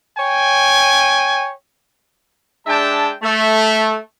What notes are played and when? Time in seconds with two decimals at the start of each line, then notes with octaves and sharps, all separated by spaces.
0.18 C#5 G5 G#5
2.67 G#3 D4 E5 G5 A5
3.22 A3